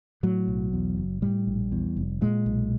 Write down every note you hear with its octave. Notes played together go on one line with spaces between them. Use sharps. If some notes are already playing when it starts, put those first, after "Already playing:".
A2 F#3
B1
E2
F#1
A2 G3
A#1
E2
F1
A#2 G#3
B1